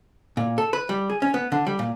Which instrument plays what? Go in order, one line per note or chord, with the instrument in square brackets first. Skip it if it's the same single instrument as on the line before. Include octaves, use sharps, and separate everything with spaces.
[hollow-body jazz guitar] A#2
A4
B4
G3
G#4
C#4
B3
D3
G3
A#2